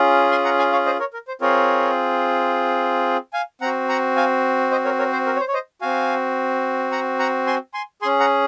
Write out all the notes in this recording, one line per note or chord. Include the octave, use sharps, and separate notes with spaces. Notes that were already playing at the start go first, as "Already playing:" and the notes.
Already playing: C#4 F4 G#4
G#5 C6
F#5 A#5
F5 G#5
C#5 F5
C5 D#5
A#4 C#5
A#4
C5
C4 F4 G#4 A#4 C#5
F5 G#5
C4 F#4 F#5 A#5
F#5 A#5
F5 G#5
C5 D#5
A#4 C#5
A#4 C#5
C5
A#4
C#5
C5
C#5
C5 D#5
C4 F#4 F5 G#5
F#5 A#5
F#5 A#5
G#5 C6
G#5 C6
C#4 G#4 G#5 C6
F#5 A#5